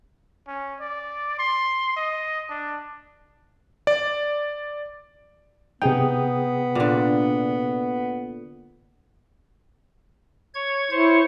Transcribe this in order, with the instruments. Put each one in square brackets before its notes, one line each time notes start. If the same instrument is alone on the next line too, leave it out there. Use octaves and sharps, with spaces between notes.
[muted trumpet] C#4
D5
C6
D#5
D4
[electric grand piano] D5
[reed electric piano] C3 G#4 G5 [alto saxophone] B3 [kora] D#4
[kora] A#2 D3
[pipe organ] C#5 G#6
[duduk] E4 [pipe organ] C5 C#5 C#6